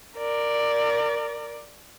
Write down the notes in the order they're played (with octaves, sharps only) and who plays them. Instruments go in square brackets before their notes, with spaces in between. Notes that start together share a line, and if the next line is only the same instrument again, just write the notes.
[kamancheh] A#4 D5